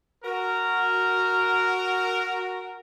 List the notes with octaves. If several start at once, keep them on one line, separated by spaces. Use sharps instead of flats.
F#4 A#4